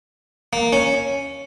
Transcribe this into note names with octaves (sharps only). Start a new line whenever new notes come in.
A#3
C#4